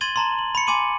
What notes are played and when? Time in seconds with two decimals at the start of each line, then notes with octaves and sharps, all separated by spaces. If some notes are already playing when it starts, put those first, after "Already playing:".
0.01 C6 G#6 A6 D#7 F#7 G7
0.16 A5 A#5 C6
0.39 F#7
0.55 B5 C#7
0.67 G#5 C6 D6 D#7 F#7